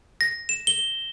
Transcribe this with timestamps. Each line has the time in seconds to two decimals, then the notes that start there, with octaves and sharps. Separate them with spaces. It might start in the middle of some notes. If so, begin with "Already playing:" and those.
0.21 A#6
0.49 E7
0.67 G7